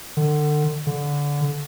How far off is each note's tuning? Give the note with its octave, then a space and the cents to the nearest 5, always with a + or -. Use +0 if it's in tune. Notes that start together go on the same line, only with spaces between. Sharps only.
D3 +30
D3 -20